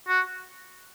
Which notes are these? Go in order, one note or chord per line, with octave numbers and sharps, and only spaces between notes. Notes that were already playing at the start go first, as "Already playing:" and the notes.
F#4